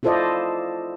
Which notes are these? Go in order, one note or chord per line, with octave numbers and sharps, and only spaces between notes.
E4 F4 A4 C5 D5 D#5